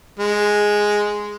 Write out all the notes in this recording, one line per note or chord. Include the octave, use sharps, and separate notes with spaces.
G#3